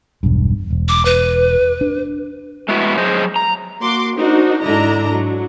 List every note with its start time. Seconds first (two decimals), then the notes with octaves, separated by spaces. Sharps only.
0.23 E1 B1 G2
0.70 E1
0.88 D6
1.05 B4
1.81 D4
2.69 A2 G#3 B3 E4 F#4
2.98 F#3 G#4 C5 D#5
3.36 A#5
3.80 A#3 F#4 C6 D6
4.16 D4 D#4 F#4 A#4 C5
4.61 G#2 D3 D4 E4 D#5 A#5
5.11 F#3